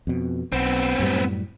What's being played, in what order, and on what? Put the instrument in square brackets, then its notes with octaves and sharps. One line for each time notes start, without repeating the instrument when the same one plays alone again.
[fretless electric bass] F2 B2
[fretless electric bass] B1 [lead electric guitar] B3 C4
[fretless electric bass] F#2 A2 G3